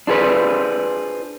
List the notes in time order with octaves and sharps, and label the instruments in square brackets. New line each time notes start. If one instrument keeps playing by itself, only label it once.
[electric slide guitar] D4 F4 G#4 B4 C5